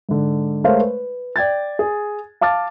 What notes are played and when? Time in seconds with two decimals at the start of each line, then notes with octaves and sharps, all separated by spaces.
0.09 G#2 D3
0.64 G#3 A3 A#4 C5 C#5 F5
0.80 B4
1.36 D5 G5 G#6 A6
1.79 G#4
2.41 F5 A5 D6 F6 A6